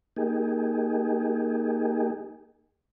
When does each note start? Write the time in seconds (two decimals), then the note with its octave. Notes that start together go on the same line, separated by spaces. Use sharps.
0.17 A#3 D#4 G4 G#4